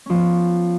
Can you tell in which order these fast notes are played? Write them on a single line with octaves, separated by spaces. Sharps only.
C#4 F3 B3